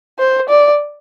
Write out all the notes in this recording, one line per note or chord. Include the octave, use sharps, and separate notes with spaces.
C5
D5